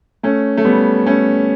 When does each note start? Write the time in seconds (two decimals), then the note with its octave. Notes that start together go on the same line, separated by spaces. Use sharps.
0.23 A3 C#4
0.57 A3
0.65 G3 B3
1.06 A3 C#4